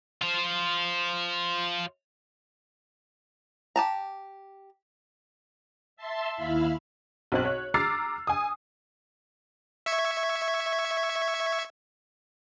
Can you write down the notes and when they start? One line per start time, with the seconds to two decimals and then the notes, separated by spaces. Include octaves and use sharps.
0.22 F4 C5
3.76 G4 A5 A#5
5.97 E5 A5 C6
6.35 D#2 E4 E5 F5 B5
7.32 B1 C4 F#6
7.45 C#5
7.74 A#5 D6 E6 F6 A6 C7
8.27 G#5 D#6
9.86 E5 C#6 G#6